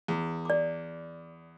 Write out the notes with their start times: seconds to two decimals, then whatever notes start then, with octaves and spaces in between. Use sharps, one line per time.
0.08 E2
0.45 D5 D6